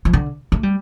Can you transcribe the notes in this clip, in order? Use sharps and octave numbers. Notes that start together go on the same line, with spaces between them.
F3
D3
A3
G3